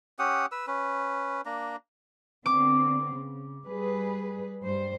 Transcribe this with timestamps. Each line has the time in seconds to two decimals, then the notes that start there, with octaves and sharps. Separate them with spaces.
0.19 C#4 G4 F#5 D#6
0.52 B4 E6
0.67 C#4 B4
1.46 A#3 D4 A#5
2.46 D3 B3 C4 D6
3.12 C#3
3.66 G3 G#4 B4
4.63 G2 G3 C5